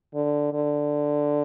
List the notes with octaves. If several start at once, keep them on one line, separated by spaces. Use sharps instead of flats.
D3
D3